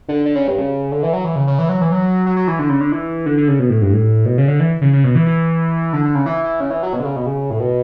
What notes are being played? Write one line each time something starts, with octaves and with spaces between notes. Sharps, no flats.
D3
D3
C#3
G2
C#3
D3
E3
F#3
E3
C#3
C#3
E3
F#3
E3
F#3
F#3
F#3
E3
D3
C#3
D3
E3
D3
D3
C#3
B2
A2
G2
A2
B2
C#3
D3
E3
C#3
C#3
B2
E3
E3
D3
D3
C#3
E3
E3
C#3
E3
F#3
B2
D3
C#3
B2
C#3
A2
B2